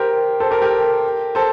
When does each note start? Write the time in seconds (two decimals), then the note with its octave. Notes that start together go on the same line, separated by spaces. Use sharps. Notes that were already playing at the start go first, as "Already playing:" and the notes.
Already playing: G4 A#4 C5
0.40 A4 C5
0.51 G4 A#4
0.62 G4 A#4
1.35 A4 C5